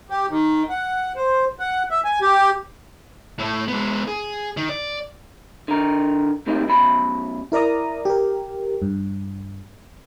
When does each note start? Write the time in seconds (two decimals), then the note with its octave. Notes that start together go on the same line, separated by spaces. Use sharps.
0.10 G4
0.30 D#3
0.70 F#5
1.16 C5
1.59 F#5
1.91 E5
2.05 G#5
2.21 G4
3.39 A2 A3
3.68 G#3 B3
4.08 G#4
4.57 D#3
4.69 D5
5.68 D3 A#4
6.47 A2 C3 D#3 A#3 D#4
6.68 F#2 B2 B5
7.52 E4 A#4 D5 A#5 D#6
8.05 G4 A#4
8.82 G2